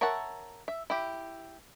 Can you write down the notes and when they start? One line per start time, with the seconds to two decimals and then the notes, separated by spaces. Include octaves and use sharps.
0.01 A#4 C#5 E5 F#5 A5
0.68 E5
0.90 E4 G4